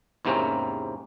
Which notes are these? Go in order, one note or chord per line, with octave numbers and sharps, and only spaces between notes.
E2 G#2 C3 A#3 C4 C#4